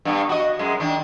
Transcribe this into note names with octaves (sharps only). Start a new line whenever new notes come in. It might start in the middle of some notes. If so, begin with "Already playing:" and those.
G2 B3
F#4 D#5
F#2 G#3
D#3 D4